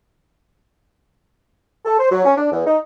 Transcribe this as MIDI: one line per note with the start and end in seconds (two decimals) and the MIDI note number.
1.85 1.95 69
1.98 2.09 72
2.11 2.24 54
2.25 2.35 61
2.37 2.46 62
2.52 2.64 40
2.67 2.78 63